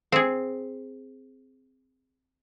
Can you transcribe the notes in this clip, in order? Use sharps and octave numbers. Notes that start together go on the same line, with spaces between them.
C4 G#4